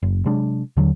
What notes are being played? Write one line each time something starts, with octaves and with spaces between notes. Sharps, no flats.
F#1
C3 F#3 G#3 D4
D#2 D3 F3 F#3